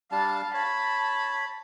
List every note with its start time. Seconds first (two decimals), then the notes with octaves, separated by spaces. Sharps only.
0.12 G3 D4 F5 A5
0.54 C#5 A5 B5